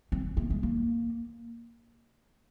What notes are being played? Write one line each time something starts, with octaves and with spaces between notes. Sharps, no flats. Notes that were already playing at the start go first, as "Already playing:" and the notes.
C4
A#3
G#3
A#3